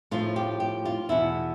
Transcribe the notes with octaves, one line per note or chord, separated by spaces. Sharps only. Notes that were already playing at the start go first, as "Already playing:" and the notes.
A2 F3 F4
G4
G4
F4
E2 B2 E4